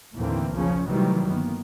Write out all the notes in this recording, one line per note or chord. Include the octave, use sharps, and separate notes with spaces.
D#2 A2 D3 E3 A#3 C4
B1 E2 C#3 F3 C#4
C3 D#3 E3 F#3 G3 A3
G1 D#3 A#3 B3